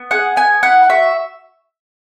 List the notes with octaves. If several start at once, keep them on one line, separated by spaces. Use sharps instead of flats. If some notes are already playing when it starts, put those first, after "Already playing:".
Already playing: B3
G#4 F#5
B3 G#5
E4 F#5
F#4 E5